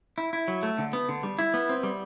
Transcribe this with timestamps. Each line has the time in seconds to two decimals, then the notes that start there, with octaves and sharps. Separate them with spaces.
0.18 E4
0.33 E4
0.48 F#3
0.63 A3
0.78 D3
0.93 B3
1.09 D3
1.23 G3
1.39 E4
1.54 B3
1.69 C4
1.83 G3